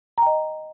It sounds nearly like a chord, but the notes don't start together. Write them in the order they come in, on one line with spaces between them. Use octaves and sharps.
A#5 G5 D#5